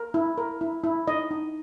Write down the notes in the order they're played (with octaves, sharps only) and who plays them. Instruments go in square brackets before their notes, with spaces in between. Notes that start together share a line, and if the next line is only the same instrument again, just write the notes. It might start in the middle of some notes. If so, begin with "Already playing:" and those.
Already playing: [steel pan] A#4
E4
A#4
E4
E4
D#4 D#5
D#4